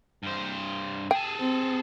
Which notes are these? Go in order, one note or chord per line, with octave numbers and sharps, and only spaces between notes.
G2 C5
G#4 A4 G5
C4